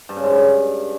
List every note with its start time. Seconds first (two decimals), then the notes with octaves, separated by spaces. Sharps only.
0.09 G2
0.16 C#3
0.23 G#2
0.31 F#2
0.38 G2